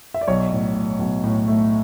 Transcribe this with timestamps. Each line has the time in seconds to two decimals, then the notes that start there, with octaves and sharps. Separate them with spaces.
0.14 E5
0.21 D5
0.28 B1 C#5
0.52 A2
0.75 A2
0.99 B1
1.24 A2
1.48 A3